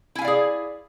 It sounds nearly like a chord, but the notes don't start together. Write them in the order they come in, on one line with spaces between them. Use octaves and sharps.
E4 G#5 F5 D5 G#4